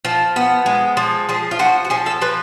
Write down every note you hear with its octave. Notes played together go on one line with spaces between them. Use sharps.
F3
B3
G#3
F3
F3 G#4
F4
F3 F#4
F#4
F3 G#4
A4
F3 B4